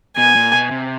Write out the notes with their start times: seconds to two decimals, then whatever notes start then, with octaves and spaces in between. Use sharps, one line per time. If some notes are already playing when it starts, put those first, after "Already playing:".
0.17 B2 G#5
0.36 A#2
0.53 B2
0.71 C3